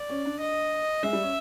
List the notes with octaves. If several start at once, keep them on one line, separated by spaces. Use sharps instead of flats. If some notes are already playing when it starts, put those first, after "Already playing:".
Already playing: D5
C#4
D4
D#5
G#3 E5
G3
C#4